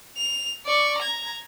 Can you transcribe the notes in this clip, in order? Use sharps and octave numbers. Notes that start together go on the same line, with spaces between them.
F7
D5 C#6
A#5 G#6